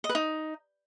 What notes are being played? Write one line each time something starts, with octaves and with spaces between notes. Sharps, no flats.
D#5
B4
D#4